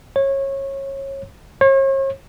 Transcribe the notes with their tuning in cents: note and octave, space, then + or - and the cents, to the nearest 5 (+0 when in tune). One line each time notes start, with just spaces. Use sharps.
C#5 -20
C#5 -40